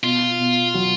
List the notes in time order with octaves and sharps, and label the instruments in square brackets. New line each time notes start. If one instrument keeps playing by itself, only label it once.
[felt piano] B2 [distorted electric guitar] F4
[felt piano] B2
F#3